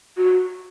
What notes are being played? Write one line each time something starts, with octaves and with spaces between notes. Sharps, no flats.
F#4